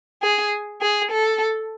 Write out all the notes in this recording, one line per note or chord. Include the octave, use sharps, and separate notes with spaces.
G#4
G#4
A4